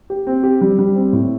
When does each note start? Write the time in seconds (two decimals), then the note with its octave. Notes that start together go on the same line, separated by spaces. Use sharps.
0.10 G4
0.27 C4
0.43 G4
0.61 G3
0.79 G3
0.95 C4
1.13 A2